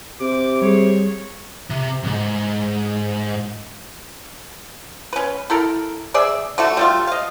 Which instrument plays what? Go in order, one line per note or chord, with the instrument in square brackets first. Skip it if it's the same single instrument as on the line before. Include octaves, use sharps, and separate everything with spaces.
[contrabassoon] C3 [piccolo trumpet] D6
[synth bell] G3 G#4 [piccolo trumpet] C#5
[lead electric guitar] C3
B1 G#2
[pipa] C#4 B4
E4 A4 A#4
G#4 D5 E5
D3 A3 F#4
G3 A3 F4
D#5 F5